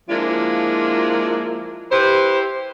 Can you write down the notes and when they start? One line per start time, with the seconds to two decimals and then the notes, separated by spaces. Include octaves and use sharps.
0.09 F3 G#3 A#3 D4 E4 F4
1.91 E4 G4 B4 C5